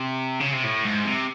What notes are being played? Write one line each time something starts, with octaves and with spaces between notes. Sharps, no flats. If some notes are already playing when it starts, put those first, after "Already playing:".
Already playing: C3
C#3
C3
A2
G#2
C3